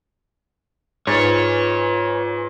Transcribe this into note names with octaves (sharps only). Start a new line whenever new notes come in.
G#2 F4 B4 C#5 G#5 A6